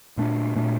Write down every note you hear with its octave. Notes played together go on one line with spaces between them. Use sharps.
A#2 A3 D4
A#2 A3 D4